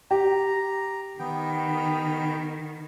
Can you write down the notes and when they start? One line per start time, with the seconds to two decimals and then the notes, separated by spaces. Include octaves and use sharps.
0.11 G4 A#5
1.19 D#3 B3 G5